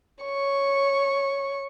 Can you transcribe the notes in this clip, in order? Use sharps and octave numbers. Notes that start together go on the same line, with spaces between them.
C#5 C#6